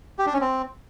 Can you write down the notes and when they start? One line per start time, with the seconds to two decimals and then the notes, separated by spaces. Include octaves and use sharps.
0.19 G4
0.26 D4
0.34 C#4
0.41 C4